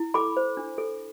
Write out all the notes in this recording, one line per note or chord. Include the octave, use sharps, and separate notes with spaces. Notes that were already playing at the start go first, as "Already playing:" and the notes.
Already playing: E4
A4 B5 D6
C5
D4
A4